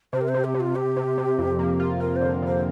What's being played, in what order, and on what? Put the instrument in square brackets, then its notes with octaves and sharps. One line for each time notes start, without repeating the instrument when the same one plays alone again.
[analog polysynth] C3 [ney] C5
[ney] A#4
C5
[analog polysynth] C3
[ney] G4
[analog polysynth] C3
[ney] F4
[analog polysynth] C3 [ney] G4
[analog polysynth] C3
C3
F2
A#3
F4
[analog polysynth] F4 [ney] A#4
[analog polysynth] D3 [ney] C5
[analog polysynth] D3 [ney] C5